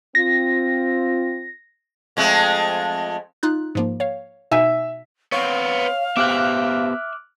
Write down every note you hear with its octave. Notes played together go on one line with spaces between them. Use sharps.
C4 F4 A#6
F2 G#3 A3
D#4 F4 F#6
G#2 F3 A#3
C#5 F5
B2 D#4 E5 G#5
B3 C4 C#5 F5
B3 G4 C5 E5 D6 F6 F#6